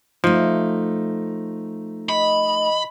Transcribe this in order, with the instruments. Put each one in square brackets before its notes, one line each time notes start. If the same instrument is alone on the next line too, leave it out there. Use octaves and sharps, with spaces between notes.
[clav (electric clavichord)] F3 [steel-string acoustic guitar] A3 D#4
[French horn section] D#5 [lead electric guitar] B5